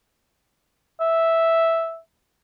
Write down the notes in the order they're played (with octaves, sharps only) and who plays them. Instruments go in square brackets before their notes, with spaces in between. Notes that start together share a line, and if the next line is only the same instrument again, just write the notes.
[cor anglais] E5